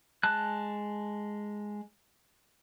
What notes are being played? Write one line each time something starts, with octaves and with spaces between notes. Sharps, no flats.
G#3 A5 F#6